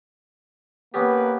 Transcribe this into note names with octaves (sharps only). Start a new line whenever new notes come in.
A#3 B3 C#4 G4 B4